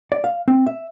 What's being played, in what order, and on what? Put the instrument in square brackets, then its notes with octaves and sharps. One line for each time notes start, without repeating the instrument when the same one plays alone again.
[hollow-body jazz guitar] D5
F5
C4
E5